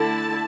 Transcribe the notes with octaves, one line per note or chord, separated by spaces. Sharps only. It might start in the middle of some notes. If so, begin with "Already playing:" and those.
Already playing: D3 A3 E4 A5